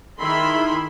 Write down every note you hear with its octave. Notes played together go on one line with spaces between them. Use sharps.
D#3 E4 G#4 E5 B5 C6